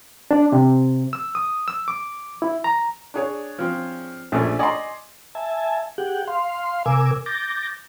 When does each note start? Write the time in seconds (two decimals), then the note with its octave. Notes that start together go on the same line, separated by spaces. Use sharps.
0.31 D4
0.52 C3
1.13 E6
1.35 D#6
1.68 E6
1.88 D6
2.42 E4
2.64 A#5
3.14 D4 G#4 C#5
3.59 F3 C4
4.32 A#1 A3 C#4 D4
4.59 D5 D#5 G#5 C6 C#6
5.35 E5 G#5 A5
5.98 G4 G#4 F#5 G5
6.27 F5 C6
6.86 C3 A#4 G#5 D6 E6
7.26 D6 G6 A6 A#6